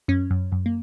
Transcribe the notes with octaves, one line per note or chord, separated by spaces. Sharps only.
F#2 C#4
F#2
F#2
A#3